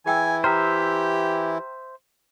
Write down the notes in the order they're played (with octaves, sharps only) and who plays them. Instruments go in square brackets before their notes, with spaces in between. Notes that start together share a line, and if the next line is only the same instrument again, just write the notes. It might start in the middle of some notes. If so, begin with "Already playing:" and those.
[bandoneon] E3 E4 [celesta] G#4 G5 E6 [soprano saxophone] G#5
[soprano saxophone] G4 [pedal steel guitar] C5 E5 [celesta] G5 A#5 F6